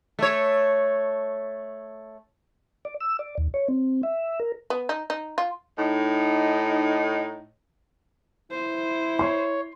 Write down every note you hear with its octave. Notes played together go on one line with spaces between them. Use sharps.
A3 C#5
D5
E6
D5
D#2
C#5
C4
E5
A#4
B3
D#4
D#4
F4
A2 D#4
E4 C5
C#5 C6